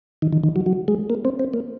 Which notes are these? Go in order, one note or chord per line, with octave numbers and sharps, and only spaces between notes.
D#3
D#3
D#3
F#3
F#3
G#3
A#3
C4
C4
A#3